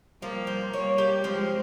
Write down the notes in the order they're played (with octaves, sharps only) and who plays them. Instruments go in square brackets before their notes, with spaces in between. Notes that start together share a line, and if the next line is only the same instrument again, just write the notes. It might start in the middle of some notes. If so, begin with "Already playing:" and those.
[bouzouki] F3 [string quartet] G3 A#3
[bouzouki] C4
[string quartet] G3 A#3 [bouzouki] C#5
[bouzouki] G4
[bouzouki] F3 [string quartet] G#3 C4